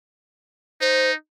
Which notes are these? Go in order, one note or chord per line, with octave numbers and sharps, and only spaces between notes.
D#4 C5